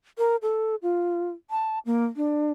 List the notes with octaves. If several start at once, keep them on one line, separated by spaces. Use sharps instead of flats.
A#4
A4
F4
A5
A#3
D4